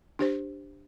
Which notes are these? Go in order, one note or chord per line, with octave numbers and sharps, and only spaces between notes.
D4 G4 C5